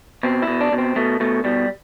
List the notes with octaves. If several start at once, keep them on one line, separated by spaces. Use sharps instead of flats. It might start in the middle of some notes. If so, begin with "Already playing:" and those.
B2 C4
E4
B2
D4
B2
C4
B2 A3
B2 A3
B2 G3